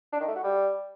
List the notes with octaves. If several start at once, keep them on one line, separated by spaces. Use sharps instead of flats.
D4
D#3
A3
F#4
G3